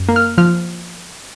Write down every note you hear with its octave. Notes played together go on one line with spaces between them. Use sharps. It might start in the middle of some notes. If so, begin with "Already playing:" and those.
Already playing: F#2
A#3
F6
F3 F6